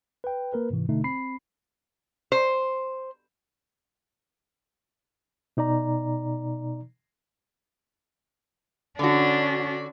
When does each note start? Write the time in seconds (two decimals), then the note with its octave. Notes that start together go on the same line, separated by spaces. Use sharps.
0.24 B4 G5
0.53 A#3 A#4 B4
0.70 G#2 C3 E3
0.89 B2 D3 A3 D#4
1.04 C4 B5 C7
2.32 C5
5.57 B2 D#4 D5 A#5
8.99 D3 C#4 D4 F#4